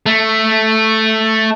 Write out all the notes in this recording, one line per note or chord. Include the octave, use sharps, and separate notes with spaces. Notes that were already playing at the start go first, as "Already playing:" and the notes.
A3